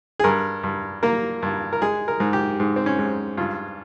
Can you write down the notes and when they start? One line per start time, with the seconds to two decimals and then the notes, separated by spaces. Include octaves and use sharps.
0.19 G#4
0.24 G2 A#4
0.63 G2
1.03 A#3 A#4
1.42 G2
1.73 A#4
1.81 G#3 G#4
2.08 A#4
2.20 G#2
2.33 G4
2.60 G#2
2.76 C4
2.86 C#4
2.99 G#2
3.37 G2 F4